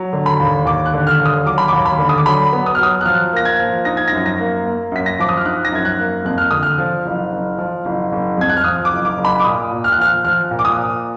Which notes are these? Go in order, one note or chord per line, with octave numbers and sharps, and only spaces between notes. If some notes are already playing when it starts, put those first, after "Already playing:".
Already playing: F#3
D3
B5
D#2
D#2 D6
F#6
D3
F6
D#2
D#6
F#3 D6
B5
D#2 D6
B5
D3
D#6
D6
F#3 B5
B3
D#6
F6
F#3 D#6
F#6
F3 F6
A#3 A#6
G#6
F3
D#4 A#6
G#6
F#2 A#6
A#6
A#3
A#3
F#2 B6
A#6
F3 D6
D#6
F6
D#4 F#6
A#6
F#2 G#6
F#6
A#3
F2 F#6
F6
D3 D#6
F6
F3
F#1
F#1
F3
F#1
F#1
F2 G#6
F#6
F6
F3 D#6
D6
F#1
D6
F#1
B5
D6
A#2 D#6
A#2
F6
F#6
F3 F6
F3 F6
A#2
D6
D#6
A#2